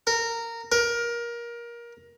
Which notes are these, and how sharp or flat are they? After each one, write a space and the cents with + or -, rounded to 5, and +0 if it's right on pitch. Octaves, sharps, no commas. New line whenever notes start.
A#4 -15
A#4 +20